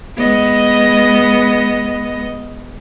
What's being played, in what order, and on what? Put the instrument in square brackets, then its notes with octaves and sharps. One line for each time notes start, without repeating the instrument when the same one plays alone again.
[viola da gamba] G#3 B3 D#5